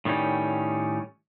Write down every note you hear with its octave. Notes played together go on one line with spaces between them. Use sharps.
A2 D#3 G3 A#3 C#4